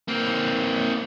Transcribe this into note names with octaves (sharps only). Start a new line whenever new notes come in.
A#3 C4